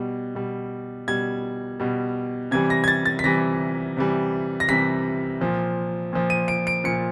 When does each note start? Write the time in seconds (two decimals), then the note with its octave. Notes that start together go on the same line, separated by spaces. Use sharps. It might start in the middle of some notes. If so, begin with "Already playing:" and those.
Already playing: B2 G3
0.35 B2 G3
1.08 B2 G3 G#6
1.80 B2 G3
2.51 C3 E3 G3 G#6
2.70 A#6
2.84 G#6
2.88 A6
3.06 A6
3.19 B6
3.24 C3 E3 G3 A#6
3.97 C3 E3 G3
4.60 A#6
4.68 C3 E3 G3 B6
5.41 A#2 F3
6.13 A#2 F3
6.30 D#7
6.48 D7
6.67 D7
6.84 A#2 F3 C#7